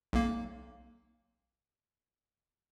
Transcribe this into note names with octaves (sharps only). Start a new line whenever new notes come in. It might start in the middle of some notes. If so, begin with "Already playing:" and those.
B1 A#3